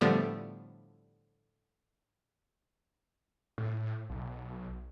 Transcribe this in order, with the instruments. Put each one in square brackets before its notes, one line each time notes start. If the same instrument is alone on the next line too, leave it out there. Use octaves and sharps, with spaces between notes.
[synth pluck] A2 D3 F3 G3 A3 B3
[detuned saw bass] A2
B1